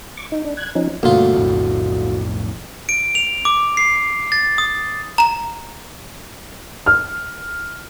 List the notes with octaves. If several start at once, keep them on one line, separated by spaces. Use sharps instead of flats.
C#6 D6
D#4
D4
F#6 G#6
F3 C#4 D#4
D2 G2 B2 A#3 F4
B1 F2 A2
D7
F7
D6
C7
A6
D#6
A#5 E7
F6